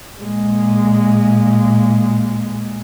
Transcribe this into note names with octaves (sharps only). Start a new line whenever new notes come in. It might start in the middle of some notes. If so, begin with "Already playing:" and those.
A#2 G#3